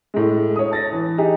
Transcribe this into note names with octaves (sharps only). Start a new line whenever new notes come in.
A2 G#3
C#5 D#6
A5 A6 A#6
E3
D#4 G4 G#4